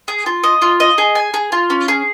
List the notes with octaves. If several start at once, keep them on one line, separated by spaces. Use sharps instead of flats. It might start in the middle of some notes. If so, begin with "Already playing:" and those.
G#4
F4
D#5
F4
D#5
G#4
G#5
G#4
F4
C#4
G#4